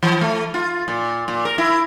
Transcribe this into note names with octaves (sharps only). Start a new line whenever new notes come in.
E3
A3
F4
A#2
A#2
A#4
E4